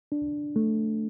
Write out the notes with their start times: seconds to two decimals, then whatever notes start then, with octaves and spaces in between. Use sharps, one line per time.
0.12 D4
0.56 A3